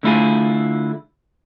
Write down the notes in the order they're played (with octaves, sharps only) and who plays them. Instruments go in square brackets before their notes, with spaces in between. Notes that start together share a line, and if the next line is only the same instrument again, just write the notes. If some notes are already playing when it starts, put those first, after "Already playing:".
[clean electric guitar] D3 A3 E4 F4 G#4